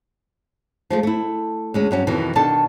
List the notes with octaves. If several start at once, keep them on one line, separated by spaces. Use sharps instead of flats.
F3 G#3 A3
A3 E4
D2 G#3 C#4
G2 F#3 C#4
F2 B2 D#3 E3
B2 D#3 D4 A4 A5